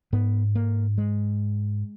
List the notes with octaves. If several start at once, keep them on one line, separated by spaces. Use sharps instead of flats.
G#2 B3
A#3
G#3